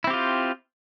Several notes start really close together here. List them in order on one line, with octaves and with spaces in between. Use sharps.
E4 C4 G4 F4